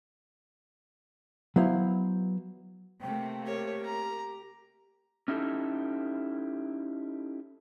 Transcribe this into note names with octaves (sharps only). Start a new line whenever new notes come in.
F#3 B3 E4 C5 F5
C3 A3 A#3 G5
G4 A#4 C#5
A#5
C#4 D#4 E4 G4 A4